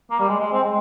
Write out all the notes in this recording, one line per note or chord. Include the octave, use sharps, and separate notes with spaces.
A#3
G3
G#3
G#3
C4
G#3